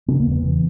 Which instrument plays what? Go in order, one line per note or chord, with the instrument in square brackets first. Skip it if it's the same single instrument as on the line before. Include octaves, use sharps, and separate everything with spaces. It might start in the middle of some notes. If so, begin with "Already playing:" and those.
[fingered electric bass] C#3 B3
A#3
E2 B3
C#3 E3